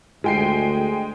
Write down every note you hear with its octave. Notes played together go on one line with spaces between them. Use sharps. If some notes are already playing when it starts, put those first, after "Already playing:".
D2 G#3 G5 C7